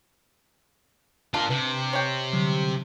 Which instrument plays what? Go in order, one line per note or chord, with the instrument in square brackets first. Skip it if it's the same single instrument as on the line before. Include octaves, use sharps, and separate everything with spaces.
[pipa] D4 [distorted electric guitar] F4 A#4 [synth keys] A5
[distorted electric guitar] C3 [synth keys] B4
[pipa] C#5 G5
[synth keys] D3 F#3 G3